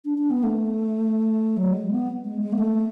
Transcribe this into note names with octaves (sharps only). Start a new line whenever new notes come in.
D4
D4
B3
A3
F#3
G#3
B3
G#3
G#3
B3
A3